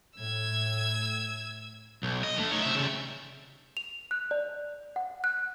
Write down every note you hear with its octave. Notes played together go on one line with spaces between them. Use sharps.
A2 E6 G#6
B1
D#5
D3 A3
D#4 C#5
C3 E5
C#3 G3
F7
F#6
D5
F#5
F#6